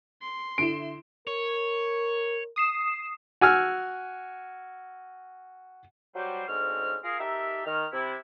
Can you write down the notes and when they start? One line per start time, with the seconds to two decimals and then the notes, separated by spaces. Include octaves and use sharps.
0.22 C6
0.58 D3 E4 D7 E7
1.27 A#4 C#5
2.56 D#6 C7 E7
3.41 F#4 G#5 E6 F6
6.15 F#3 G3 C5
6.48 D2 G#2 C4 C#4 F6
7.04 F4 G#4 A#4 F5
7.19 D#4 G4 A4 A#4 E5
7.66 D#3 F6
7.92 C3 E4